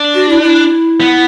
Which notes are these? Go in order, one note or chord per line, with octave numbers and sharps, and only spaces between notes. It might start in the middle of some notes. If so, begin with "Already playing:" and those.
Already playing: D4
F#4
E4
E4
B3